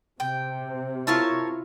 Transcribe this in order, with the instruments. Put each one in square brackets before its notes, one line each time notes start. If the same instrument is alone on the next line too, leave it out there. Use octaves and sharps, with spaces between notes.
[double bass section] C3 [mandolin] G5
[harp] E4 F4 [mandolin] A#4 C#5 A5